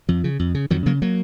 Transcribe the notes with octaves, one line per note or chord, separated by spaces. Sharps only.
F2 F3
C#3
F2
C#3
F2 D#3 F#3
C#3 F#3 A#3
F#3 A#3